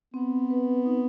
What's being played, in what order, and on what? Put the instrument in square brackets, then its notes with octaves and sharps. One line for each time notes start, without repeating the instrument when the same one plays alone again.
[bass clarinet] B3 [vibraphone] C4
[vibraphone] B4
D#4